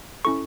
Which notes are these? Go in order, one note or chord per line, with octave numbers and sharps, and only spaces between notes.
C#4 E4 A4 C#6